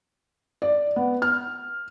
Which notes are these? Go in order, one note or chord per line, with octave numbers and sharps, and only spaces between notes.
D5
B3
F6